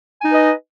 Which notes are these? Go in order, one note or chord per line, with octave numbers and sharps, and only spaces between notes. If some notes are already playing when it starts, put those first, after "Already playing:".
D#4 B4 D#5 G#5